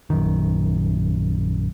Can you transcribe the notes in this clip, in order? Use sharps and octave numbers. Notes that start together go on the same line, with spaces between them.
A#1 F#2 D#3